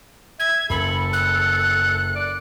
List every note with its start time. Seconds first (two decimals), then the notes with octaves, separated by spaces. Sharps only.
0.40 E5 G#6
0.70 F#1 A4 B5
1.13 F#6
2.15 D5